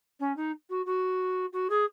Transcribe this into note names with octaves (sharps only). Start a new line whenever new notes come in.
C#4
D#4
F#4
F#4
F#4
G#4